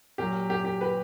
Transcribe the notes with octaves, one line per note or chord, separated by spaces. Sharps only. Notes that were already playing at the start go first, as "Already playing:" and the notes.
A#2 F#3 G4
G4
G4
G4 B4